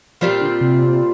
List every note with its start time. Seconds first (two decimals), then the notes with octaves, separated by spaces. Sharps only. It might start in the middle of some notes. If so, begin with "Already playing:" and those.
0.21 A#2 F3 G3 C4 F4
0.41 D3
0.61 C3